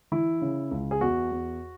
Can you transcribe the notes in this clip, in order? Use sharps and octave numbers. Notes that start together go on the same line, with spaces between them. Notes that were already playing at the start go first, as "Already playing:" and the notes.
E3 E4
C#3
C#2
G#4
E2 F#4
E2